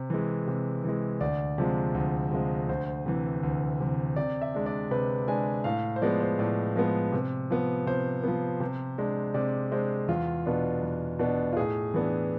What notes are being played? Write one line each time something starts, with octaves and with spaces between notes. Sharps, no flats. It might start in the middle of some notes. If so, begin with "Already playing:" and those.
Already playing: C3
E3 G#3
C3
E3 G#3
D2 D5
C3 F3 G#3
D2
C3 F3 G#3
D2 C5
C3 E3
D2
C3 E3
C3 D5
E5
G#3 D4
D5
C3 B4
G#3 D4 G#5
A2 F5
C5
F3 G#3 B3 D5
C5
A2 D5
F3 G#3 B3
C3
F3 B3
C3 C5
F3 B3
C3
G#3 D4
C3 D5
G#3 D4 C5
E2 F4
B2 B3 D4
E2
B2 B3 D4
F4
A2 G#4
E3 B3 D4